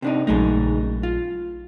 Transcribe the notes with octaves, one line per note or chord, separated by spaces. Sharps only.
C3 D4 D#4
A#1 C#3 F#3 G#3 A3 D#4
F4